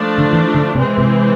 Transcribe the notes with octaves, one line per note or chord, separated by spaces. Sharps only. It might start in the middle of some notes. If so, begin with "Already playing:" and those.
Already playing: F3 A3 D4
D3
E3
D3
C3 E3 G#3 C4
C3